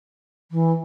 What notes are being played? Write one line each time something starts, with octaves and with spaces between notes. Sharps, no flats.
E3